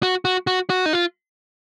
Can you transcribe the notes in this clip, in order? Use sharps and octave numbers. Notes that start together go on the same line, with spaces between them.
F#4
F#4
F#4
F#4
D#4
F4